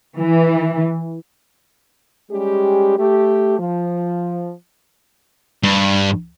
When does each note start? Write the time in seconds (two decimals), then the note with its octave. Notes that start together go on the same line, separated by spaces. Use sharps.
0.18 E3
2.32 G3 G#3 C#4 G4
2.99 A3 G4
3.60 F3
5.63 G2